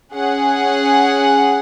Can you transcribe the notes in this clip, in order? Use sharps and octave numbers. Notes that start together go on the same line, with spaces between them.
C#4 G#4 F#5